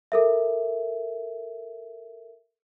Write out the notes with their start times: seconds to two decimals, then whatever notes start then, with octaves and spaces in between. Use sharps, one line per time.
0.12 A4 A#4 E5